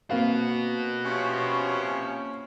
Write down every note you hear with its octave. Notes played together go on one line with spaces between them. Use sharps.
A#3 C4 F#4 B4 F5
C3 F3 C#4